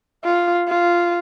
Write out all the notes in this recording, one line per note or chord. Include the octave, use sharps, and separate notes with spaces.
F4
F4